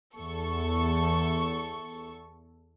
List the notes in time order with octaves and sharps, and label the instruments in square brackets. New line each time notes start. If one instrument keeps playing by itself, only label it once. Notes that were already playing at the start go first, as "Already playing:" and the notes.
[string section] E2 A4 C#6